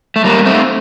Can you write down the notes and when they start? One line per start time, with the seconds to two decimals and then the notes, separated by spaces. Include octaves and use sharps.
0.16 A3
0.24 G3 A#3
0.46 A3 C4